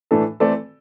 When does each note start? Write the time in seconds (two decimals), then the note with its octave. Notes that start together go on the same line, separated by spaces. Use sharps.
0.11 A2 E3 A3 D4 A4
0.40 E3 A3 C4 A4 D5